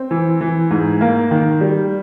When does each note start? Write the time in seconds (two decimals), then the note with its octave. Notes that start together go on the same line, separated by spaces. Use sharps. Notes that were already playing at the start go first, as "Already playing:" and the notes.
Already playing: C4
0.11 E3
0.41 E3
0.71 G#2
1.01 A#3
1.31 D#3
1.61 G3